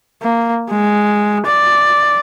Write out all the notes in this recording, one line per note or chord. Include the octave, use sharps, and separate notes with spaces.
A#3
G#3
D5